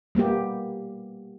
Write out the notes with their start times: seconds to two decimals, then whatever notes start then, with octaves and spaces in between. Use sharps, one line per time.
0.15 G3 A#3 B3 G4